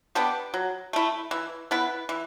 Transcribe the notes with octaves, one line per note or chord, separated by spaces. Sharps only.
B3 D4 G4
F#3
A3 E4
E3
B3 E4 B4
E3